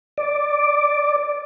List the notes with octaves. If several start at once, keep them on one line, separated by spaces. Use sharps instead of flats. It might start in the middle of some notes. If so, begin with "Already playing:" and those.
D5